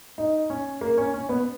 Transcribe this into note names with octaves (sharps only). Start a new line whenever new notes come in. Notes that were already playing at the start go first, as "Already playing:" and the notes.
D#4
C#4
A#3
C#4
C#4
B3